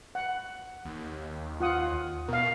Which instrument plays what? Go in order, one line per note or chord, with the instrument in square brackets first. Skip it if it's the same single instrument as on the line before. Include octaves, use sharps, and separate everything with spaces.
[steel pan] F#5
[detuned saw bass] D#2
[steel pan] F4 F#5 D#6
[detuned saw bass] B2 [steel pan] A#4 F5